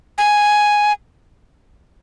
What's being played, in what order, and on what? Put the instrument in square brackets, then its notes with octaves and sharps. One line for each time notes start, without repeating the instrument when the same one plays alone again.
[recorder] G#5